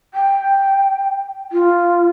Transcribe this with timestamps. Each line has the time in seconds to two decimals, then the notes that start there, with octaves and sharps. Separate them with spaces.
0.14 G5
1.52 F4